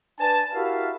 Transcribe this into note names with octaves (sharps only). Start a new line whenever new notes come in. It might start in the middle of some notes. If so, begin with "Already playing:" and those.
D4 B4 G#5 A5
E4 F#4 G4 A#4 E5 F5